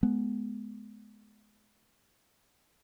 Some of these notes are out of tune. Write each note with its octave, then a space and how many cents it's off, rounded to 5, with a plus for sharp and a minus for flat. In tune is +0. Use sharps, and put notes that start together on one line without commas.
G#3 +30 B3 +0